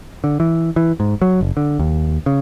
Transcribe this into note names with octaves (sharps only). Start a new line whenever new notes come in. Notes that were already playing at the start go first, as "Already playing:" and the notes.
D3
E3
E3
G#2
F#3
F#1
D3
D#2
C#3